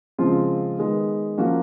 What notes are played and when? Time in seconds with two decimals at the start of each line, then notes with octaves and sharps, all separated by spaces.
0.18 C#3 F3 G#3 C4 F4
0.78 D#3 G#3 B3
1.38 F3 A#3 C#4 F#4